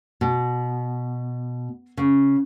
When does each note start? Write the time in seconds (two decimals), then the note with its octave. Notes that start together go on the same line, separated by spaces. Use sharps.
0.21 B2
1.97 C#3